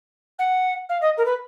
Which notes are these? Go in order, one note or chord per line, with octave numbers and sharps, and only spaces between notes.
F#5
F5
D#5
A#4
B4